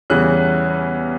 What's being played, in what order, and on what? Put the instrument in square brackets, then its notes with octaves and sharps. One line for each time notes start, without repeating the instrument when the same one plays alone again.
[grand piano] E2 C#3 E3 G3 C#4 F#6